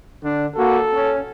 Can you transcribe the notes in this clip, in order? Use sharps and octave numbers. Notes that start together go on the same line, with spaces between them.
D3 D4
A#3 F#4 A4
C#4